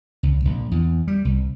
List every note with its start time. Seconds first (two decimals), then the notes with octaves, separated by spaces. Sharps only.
0.23 C#2
0.45 A#1
0.71 E2
1.08 G3
1.25 C2